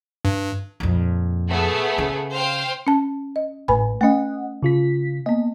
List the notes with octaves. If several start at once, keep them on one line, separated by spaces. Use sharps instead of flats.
G2
F2 A#2
A3 B3 G#4
C#3
C5 F5 G5
C#4 A5
D#5
G#1 A2 B4 G#5 B5
A3 C#4 D#5 F#5
C#3 F4 B6
A#3 B3 D#5